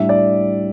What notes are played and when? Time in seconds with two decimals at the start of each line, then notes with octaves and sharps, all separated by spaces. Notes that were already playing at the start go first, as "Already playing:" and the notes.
Already playing: A2 G3 D4 E5
0.09 D5